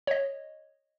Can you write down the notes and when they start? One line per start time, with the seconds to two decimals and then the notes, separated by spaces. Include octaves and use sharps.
0.07 C#5 D#5